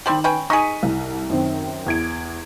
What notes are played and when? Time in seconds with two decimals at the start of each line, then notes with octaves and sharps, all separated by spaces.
0.06 D#3 G3 C4 G4 F#7
0.24 C#4 B4 G5
0.50 D#4 G#4 C#6 B6 D#7
0.83 C2
1.30 F#2 D#3 C4
1.86 E2 G#6 D7